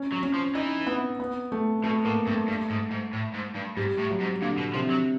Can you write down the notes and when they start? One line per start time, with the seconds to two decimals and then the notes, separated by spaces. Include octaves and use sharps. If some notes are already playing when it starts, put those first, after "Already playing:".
Already playing: C#4
0.12 F#3
0.23 C#4
0.34 F3
0.55 E3 D#4
0.87 B3
1.20 B3
1.52 A3
1.84 B2 A3
2.05 A2 A#3
2.27 G2 A3
2.48 G2
2.70 G#2
2.91 G#2
3.13 A2
3.34 G#2
3.55 G2
3.77 G#2 G3
3.98 A2
4.10 F#3
4.20 G#2
4.42 A#2 D3
4.58 B2
4.74 C3 F3
4.90 F#3